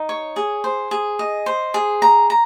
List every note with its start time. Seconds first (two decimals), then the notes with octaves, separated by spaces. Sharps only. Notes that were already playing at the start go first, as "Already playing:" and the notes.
Already playing: D#4
0.09 C#5
0.36 G#4
0.64 C5
0.91 G#4
1.19 D#5
1.46 C5
1.74 G#4
2.02 A#5
2.30 A#5